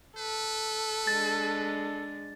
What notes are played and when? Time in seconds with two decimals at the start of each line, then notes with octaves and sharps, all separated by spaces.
0.17 A4 B4
1.07 G#3 D4 A6